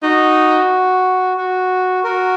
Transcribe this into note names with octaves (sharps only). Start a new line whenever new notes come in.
D#4 F#4
F#4
F#4 A#4